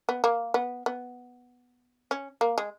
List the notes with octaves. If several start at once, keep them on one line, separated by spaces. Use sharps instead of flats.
B3
A#3
B3
B3
C#4
A#3
G#3